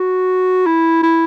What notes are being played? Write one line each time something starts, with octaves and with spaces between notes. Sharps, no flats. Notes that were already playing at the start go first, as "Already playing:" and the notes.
Already playing: F#4
E4
E4